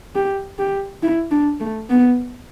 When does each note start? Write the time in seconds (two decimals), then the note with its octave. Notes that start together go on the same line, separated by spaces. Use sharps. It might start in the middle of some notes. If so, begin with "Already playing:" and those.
0.15 G4
0.59 G4
1.03 E4
1.31 D4
1.60 A3
1.90 B3